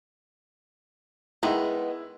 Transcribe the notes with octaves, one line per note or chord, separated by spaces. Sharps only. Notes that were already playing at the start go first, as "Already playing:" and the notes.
D#3 G#3 B3 E4 G#4 D#5